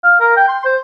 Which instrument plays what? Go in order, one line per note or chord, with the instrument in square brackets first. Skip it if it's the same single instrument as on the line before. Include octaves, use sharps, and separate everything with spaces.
[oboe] F5
A#4
G5
C6
C5